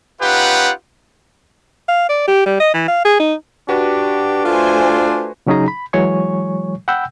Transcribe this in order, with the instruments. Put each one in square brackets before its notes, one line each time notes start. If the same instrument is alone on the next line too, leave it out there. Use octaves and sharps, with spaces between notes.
[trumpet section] C#4 D#4 F4 G4 B4 F#5
[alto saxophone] F5
D5
G4
G3
D#5
E3
F5
G#4
D#4
[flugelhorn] D4 [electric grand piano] F#4 B4 [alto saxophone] G4
[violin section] A3 C5 G#5 [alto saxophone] F4
[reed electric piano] C#3 F#3 C#4 D#4 G#4 A#5
B5
E3 F#3 G#3 C#5 G#5 C#6
F#5 G5 B5 E6 G6